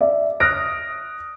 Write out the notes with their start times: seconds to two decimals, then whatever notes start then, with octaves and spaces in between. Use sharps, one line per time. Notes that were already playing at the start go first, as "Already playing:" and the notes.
0.01 D5 E5
0.40 D#6 F6 F#6 A#6 D7